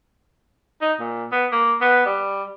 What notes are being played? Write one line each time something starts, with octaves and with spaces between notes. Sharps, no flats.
D#4
A#2
B3
A#3
B3
G3